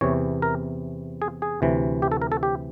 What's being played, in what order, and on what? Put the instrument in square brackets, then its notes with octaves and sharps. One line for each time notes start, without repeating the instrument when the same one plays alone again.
[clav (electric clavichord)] E2 C3 E3 C#5
A#4
G#4
G#4
D2 C3 E3
G4
A4
A#4
A4
G4